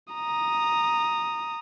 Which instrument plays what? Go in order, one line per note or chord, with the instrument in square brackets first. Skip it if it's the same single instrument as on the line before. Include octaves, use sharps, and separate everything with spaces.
[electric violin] A#5 D#6